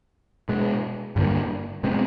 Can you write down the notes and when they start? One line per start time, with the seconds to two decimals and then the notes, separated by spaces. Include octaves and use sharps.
0.49 B2 G#3 B3
1.16 G2 D3 G3 A#3
1.83 B2 G#3 C4